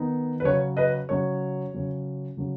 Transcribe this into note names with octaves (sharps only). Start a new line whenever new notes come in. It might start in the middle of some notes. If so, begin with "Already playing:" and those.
Already playing: D#3 B3 D#4
B4
C#3 F#3 C#4 C#5
B4 D#5
C#3 F#3 C#4 C#5
C#3 F#3 C#4
C#3 F#3 C#4